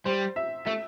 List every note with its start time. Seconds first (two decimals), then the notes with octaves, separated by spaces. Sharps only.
0.05 G3 C5
0.36 E5
0.66 A3 E5